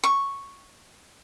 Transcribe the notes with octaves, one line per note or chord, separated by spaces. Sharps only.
C#6